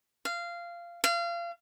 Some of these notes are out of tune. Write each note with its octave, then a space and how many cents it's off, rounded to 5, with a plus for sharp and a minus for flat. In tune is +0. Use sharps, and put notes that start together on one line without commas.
F5 -15
F5 -30